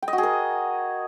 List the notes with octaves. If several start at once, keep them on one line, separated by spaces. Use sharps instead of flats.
G5
D#5
F#4
G#4
A#4